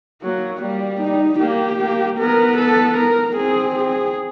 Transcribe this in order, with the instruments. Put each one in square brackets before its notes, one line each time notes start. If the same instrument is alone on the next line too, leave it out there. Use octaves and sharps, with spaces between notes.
[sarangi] F#3 [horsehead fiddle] A#3
[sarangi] G3 [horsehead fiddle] A#3
[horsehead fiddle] D#4
[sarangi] A#3 [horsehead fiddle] G4
[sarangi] A#3
[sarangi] B3 [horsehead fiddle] A#4
[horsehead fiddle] A4
A#4
[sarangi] C4 [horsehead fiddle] G#4
[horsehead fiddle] G#4